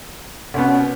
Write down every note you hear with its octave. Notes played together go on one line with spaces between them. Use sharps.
C2 B2 B3 C#4